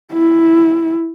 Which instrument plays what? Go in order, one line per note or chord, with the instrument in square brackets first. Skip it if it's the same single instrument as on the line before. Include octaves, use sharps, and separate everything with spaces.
[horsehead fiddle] E4